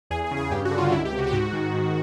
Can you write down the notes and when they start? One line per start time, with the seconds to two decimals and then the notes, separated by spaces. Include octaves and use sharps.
0.10 E2 G#4
0.24 G#4
0.31 C#3
0.37 G#4
0.51 G2 G4
0.65 F#4
0.71 D3
0.78 F4
0.92 C#2 E4
1.05 G4
1.12 C3
1.18 F#4
1.27 G4
1.32 G#2 F#4
1.53 D#3
1.74 G#2